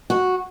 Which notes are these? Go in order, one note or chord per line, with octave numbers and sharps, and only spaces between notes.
F#4